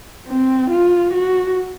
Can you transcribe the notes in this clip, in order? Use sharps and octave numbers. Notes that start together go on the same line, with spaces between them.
C4
F4
F#4